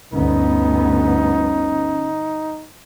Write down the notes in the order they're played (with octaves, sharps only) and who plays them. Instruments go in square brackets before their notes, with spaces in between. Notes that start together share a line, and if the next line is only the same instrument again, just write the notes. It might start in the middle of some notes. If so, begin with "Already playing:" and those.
[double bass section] G1 D2 B3 [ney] C#4 [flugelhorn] D#4